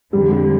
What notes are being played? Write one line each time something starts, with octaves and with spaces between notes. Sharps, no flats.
F2 D3 F3 G3
G3